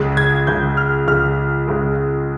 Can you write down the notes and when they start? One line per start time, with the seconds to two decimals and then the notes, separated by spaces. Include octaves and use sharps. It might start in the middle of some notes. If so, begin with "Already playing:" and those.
Already playing: C#2 C#3 G#3
0.17 G#6
0.47 C#2 C#3 G#3 G6
0.77 F6
1.08 C#2 C#3 G#3 F6
1.68 C#2 C#3 G#3